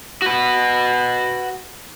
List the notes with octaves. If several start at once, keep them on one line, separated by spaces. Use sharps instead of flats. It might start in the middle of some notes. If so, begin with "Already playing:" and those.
F#4 B4